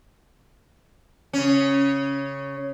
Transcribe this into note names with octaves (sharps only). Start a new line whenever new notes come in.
C#3 C#4